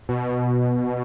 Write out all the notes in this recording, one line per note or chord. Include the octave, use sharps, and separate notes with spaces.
B2